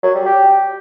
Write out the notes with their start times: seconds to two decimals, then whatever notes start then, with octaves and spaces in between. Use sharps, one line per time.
0.03 F#3
0.15 G3
0.26 G4